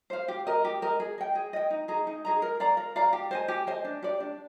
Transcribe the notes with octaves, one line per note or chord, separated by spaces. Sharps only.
C5 F5
G4
A#4 D#5
G4
A#4 D#5
G#4
D#5 G5
G#4
D#5 G5
D#4
G#4 D#5 A#5
D#4
G#4 D#5 A#5
A#4
D5 F5 A#5
A#4
D5 F5 A#5
G4
C5 D#5 G#5
G4
C5 D#5 G#5
D4
G4 D5
D4